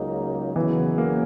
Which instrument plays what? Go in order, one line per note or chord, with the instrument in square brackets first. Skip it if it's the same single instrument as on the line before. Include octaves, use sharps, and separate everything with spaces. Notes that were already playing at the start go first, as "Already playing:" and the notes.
Already playing: [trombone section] C#2 C#3 F#3 A#3 D#4
[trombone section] E2 C#3 F#3 B3 [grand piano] E3
[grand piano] A#3